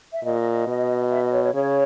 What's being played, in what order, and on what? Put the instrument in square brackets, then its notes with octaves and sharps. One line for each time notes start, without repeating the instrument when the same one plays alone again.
[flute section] E5
[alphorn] A#2 [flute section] D#5
[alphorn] B2
[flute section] E5
D#5
C#5
C#5
[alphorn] C#3 [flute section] C#5